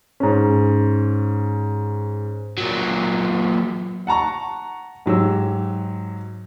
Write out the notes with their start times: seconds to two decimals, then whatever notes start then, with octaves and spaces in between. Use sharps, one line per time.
0.20 G#2 C#4
2.58 A#2 F#3
4.07 F#5 A5 A#5 C#6
5.06 G#2 F#3 G4 E6